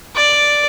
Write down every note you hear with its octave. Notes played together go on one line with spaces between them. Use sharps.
D5